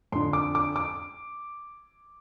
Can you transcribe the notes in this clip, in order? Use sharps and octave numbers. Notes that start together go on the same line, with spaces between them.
F2 D3 C6
D6
D6
D6